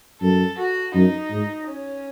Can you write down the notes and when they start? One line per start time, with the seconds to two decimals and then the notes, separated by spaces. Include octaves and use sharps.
0.21 F#2 A4
0.58 F#4
0.94 F#2 D#4
1.30 G#2
1.67 C#4